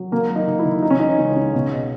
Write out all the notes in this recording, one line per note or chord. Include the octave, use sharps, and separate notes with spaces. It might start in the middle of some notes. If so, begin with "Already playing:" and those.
Already playing: F#3
D#3 A#3
F#3
D#4
D#3
E4
D#3
C#3 D#4
C#4
E3 D#4
C#2
C#3
B2